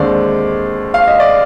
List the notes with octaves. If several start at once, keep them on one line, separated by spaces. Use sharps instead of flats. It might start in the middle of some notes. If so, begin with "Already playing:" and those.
Already playing: D#2 D3 G#3 C4 D5
F5
D#5
D5